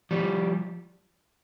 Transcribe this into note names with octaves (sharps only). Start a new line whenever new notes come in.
F3 G3